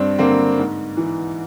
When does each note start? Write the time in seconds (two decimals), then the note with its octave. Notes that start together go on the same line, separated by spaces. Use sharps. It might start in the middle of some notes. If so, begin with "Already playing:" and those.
Already playing: G2 C4 D4
0.19 D3 A#3 C4
0.58 G#2
0.97 E3